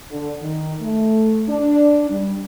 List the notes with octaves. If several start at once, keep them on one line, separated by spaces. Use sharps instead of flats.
D3
D#3
A3
D4
G3